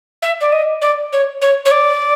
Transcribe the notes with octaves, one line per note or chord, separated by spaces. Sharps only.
E5
D5
D#5
D5
C#5
C#5
C#5
D5